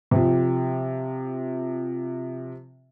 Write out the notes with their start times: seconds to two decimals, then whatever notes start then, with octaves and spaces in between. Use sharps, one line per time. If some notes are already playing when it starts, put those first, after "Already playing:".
0.11 C3 F3